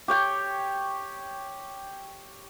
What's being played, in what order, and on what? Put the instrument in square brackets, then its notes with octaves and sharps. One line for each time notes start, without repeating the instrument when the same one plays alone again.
[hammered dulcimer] G4 C#5 G5